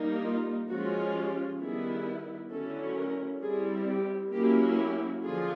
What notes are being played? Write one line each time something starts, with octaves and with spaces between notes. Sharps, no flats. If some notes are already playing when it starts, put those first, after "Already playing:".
Already playing: G3 A#3 D#4
F4
F3 G#3 C#4 F4 F#4
G4
D#3 G3 B3 E4 G#4
D3 F#3 A3 C#4 E4 A4
A#4
G3 C4 E4 G#4
G4
F#3 A#3 C#4 E4 G4
G4
D3 F3 F4 G#4